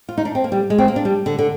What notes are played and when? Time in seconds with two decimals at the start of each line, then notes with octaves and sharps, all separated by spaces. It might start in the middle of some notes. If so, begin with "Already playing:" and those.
0.09 F4
0.18 D#4
0.25 D4
0.35 C4
0.44 A#3
0.52 G3
0.70 G#3
0.78 C4
0.88 A#3
0.96 D4
1.05 G3
1.26 D3
1.39 D3